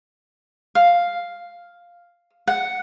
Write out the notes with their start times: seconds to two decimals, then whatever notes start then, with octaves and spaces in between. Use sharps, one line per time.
0.75 F5
2.47 F#5